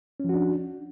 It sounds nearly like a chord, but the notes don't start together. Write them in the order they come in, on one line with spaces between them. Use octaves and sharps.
C#4 F3 F#4 D4